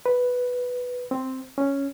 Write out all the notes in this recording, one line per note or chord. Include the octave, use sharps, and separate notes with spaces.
B4
C4
C#4